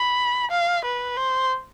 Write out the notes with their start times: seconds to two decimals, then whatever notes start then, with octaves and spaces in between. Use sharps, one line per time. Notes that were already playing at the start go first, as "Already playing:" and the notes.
Already playing: B5
0.51 F5
0.85 B4
1.16 C5